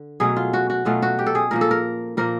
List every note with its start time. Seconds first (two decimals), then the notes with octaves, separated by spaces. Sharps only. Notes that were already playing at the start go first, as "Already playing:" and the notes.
Already playing: D3
0.20 B2 F#3 A3 C#4 G#4
0.36 F4
0.53 F#4
0.70 F#4
0.85 B2 F#3 A3 C#4 F4
1.02 F#4
1.19 G4
1.26 A4
1.35 G#4
1.51 A#2 F3 A#3 A#4
1.61 A4
1.71 A#4
2.17 A#2 F3 A#3 A#4